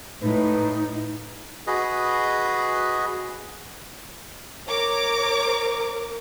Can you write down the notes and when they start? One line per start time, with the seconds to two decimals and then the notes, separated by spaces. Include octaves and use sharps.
0.23 A2 D#4 B4
1.67 F#4 G#4 B4 D#5
4.68 A#4 C#5 A#5 D6